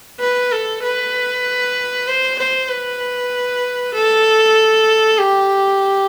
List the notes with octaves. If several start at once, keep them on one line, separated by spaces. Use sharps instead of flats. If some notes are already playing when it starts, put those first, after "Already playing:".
B4
A4
B4
C5
C5
B4
A4
G4